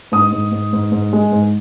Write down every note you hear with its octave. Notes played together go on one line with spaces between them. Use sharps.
G#2 D#6
G#2
G#2
G#2
G#2
G#3
G#2